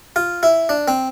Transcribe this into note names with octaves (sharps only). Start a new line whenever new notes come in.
F4
E4
D4
C4